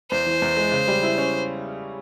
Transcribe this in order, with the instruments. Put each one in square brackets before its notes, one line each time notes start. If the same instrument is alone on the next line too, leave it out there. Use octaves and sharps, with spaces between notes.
[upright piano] E2 [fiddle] C5
[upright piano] E3
E2
G#3
C#3
G3
E4
C#4